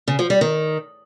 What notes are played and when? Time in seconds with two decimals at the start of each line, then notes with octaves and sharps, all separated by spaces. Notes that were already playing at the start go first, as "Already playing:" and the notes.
0.08 C#3
0.19 F3
0.30 G3
0.41 D#3